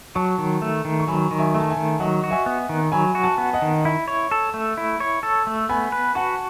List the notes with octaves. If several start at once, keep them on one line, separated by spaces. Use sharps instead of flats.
F#3 A5 C#6
D#3
A3
D#3
C#6
F#3 G#5 B5
D#3
E5 G#5
A3
A5
E5 G#5
D#3
F#3 D#5 F#5
F#4
E5 G#5
B3
D#3
F#3 G#5 B5
F#4
F#5 A5
B3
D#5 F#5
D#3
E4
C#5
A4
A3
E4
C#5
A4
A3
B3 G#5 B5
B4
F#4 F#5 A5